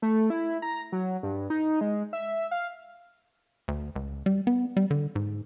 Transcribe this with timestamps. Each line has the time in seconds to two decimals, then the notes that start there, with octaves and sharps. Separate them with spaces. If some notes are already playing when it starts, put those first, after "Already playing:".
0.02 A3
0.30 E4
0.62 A#5
0.92 F#3
1.23 G2
1.50 D#4
1.81 G#3
2.13 E5
2.51 F5
3.68 D2
3.96 C#2
4.26 G3
4.47 B3
4.77 G3
4.91 D3
5.16 G#2